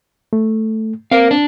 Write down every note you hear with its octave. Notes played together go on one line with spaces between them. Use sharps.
A3
C4 A#4 F5
D4